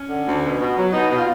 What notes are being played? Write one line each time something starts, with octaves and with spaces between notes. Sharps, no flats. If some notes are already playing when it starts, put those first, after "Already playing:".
Already playing: C#4
D3
D2
B2
B2
F#3
B2 D#4
B2
F4